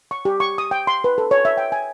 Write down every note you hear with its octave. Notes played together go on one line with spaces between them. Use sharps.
C#6
G4
C#6
D#6
G5
C6
B4
A4
C#5
E5
G5
G#5